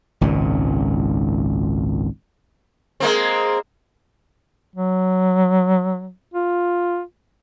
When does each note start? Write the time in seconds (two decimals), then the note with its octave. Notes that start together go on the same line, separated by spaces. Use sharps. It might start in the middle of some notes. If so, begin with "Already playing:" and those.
0.21 G#1 C#2 A#2
3.00 G#3 A#3 C4
4.76 F#3
6.34 F4